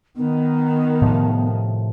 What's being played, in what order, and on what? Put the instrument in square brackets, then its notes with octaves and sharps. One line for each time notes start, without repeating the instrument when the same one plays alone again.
[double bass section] D#3 [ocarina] B3
[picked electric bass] A2 C3 F3